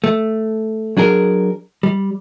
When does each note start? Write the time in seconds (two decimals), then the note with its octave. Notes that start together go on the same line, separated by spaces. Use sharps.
0.04 A3
0.97 F#3 D4 G#4 A#4
1.83 G3